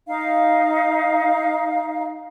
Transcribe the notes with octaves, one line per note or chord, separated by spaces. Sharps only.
D#4 F5